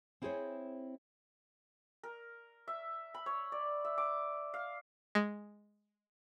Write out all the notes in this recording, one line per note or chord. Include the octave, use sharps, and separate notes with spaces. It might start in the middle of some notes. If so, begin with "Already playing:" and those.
C4 E4 G#4 A4 C5 C#5
A#4
E5
B5
C#5
D5
E5
D6
F5
G#3